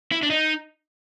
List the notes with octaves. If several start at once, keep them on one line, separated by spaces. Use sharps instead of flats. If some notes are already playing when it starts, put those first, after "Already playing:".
E4
D4
D#4